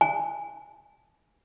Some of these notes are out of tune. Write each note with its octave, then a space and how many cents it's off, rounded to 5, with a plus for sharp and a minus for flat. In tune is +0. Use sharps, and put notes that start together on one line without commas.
G#5 -20